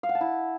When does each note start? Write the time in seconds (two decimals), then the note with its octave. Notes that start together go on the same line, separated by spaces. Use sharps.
0.03 F5
0.09 F#5
0.15 A5
0.21 E4